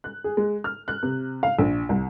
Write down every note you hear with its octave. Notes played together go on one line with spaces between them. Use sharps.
F#6
G#4
G#3
F6
F#6
C3
F5
A#1
C2